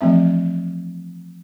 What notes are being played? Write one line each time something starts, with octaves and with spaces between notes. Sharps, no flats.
E3 F3 A3 C4 E5